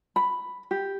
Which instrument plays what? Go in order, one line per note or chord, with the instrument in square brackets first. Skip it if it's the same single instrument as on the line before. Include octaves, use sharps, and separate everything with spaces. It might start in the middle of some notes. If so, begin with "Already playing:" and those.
[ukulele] B5
G4